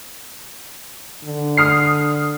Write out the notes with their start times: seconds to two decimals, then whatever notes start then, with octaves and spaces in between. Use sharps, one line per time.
1.25 D3
1.57 D#6 F6 C7